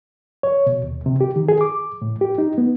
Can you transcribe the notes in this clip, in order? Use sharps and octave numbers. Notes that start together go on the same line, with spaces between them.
C#5
B2
D#2
C3
G4
D#3
G#4
D6
A2
G4
D#4
B3